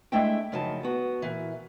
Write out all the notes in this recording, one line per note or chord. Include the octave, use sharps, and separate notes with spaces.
G#3 A3 D4 E4 E5 G5
F#2 C#3 F3 D#4 A5
B3 F#4
A#2 E3